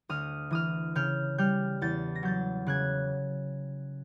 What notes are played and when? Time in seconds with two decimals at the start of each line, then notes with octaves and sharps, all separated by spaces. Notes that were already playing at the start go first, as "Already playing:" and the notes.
0.09 D2 D#6 F6
0.51 E3 D#6 F6
0.95 C#3 F6 G6
1.38 G3 F6 G6
1.81 E2 G6 A6
2.15 A#6
2.23 F#3 G6 A6
2.67 C#3 F#6 G#6